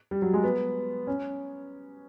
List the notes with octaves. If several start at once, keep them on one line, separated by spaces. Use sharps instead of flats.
G3
F#3
G#3
B3
C#4